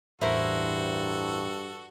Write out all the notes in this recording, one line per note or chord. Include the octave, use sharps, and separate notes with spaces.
A1 E2 G2 E4 F#4 A4 A#4 C5